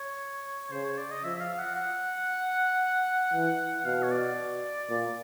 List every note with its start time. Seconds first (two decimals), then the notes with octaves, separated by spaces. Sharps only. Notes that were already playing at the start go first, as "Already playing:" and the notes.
Already playing: C#5
0.71 C#3 C5
0.84 C#5
0.98 D5
1.11 D#5
1.24 F3 E5
1.36 E5
1.41 F5
1.58 F#5
1.75 F#5
3.33 E3
3.85 B2 F5
4.03 C#5
4.12 D5
4.90 A#2